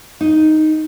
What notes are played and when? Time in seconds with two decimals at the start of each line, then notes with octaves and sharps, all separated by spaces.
0.21 D#4